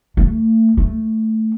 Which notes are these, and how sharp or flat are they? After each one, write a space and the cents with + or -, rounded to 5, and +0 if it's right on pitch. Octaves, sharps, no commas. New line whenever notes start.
A3 +30
A3 +5